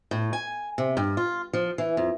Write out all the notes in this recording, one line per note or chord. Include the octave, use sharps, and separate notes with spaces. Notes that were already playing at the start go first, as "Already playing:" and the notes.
A2
G#5
C3
G2
F4
F3
E3
F2